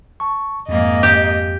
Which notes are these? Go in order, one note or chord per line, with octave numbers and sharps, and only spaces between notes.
A5 C#6
F2 G#2 A#3 D#5
G4